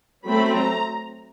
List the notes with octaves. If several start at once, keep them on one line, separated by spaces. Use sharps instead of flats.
F#3 A3 C4 B5
A#5